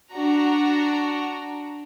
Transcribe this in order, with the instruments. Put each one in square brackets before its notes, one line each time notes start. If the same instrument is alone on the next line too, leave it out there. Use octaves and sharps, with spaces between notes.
[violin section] D4 F#4 A#5